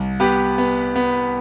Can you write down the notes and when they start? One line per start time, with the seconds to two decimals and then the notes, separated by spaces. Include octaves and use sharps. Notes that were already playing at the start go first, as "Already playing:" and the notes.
Already playing: C2
0.20 B3 G4 B4
0.58 B3
0.96 B3